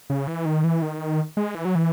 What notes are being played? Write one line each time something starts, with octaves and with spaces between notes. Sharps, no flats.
C#3
E3
D#3
E3
D#3
G#3
E3
F#3
E3